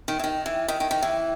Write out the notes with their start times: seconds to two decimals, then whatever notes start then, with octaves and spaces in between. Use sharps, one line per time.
0.08 D#3
0.19 E3
0.24 D#3
0.46 E3
0.68 D#3
0.80 D#3
0.91 D#3
1.03 E3